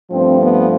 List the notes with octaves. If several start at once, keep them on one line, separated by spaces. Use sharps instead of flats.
G2 F3 A3 C4
B3